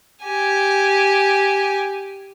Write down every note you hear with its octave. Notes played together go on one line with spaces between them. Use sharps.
G4 G#5